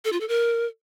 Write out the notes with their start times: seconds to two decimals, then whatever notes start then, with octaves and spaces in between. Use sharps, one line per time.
0.05 A4
0.13 F4
0.21 A4
0.28 A#4